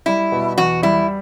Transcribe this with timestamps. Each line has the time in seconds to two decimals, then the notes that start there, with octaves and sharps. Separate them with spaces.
0.06 G3 E4
0.32 B2
0.58 E2 F#4
0.83 G3 E4